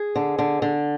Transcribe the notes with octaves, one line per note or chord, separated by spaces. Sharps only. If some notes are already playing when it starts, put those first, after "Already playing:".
Already playing: G#4
D3
D3
D3